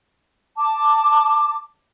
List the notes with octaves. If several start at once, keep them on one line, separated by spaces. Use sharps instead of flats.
A5 D6